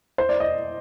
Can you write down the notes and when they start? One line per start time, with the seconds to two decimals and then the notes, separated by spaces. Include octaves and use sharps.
0.18 C5
0.29 D5
0.40 D#5